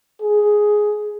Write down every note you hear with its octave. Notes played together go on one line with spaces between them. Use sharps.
G#4